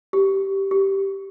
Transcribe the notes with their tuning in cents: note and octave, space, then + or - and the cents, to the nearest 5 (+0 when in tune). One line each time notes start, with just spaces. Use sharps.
G4 -10
G4 -5